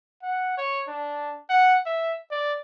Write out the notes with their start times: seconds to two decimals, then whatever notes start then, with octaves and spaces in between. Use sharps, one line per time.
0.23 F#5
0.57 C#5
0.88 D4
1.50 F#5
1.86 E5
2.31 D5